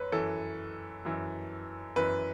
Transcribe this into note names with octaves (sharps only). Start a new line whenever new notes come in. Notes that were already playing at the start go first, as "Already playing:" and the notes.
Already playing: F#2 B4 C#5
F#2 E3 A4
F#2 E3
F#2 E3 B4